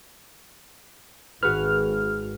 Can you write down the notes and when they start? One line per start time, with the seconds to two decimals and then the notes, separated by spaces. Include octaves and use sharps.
1.43 G#1 F#4 G#4 B4 F6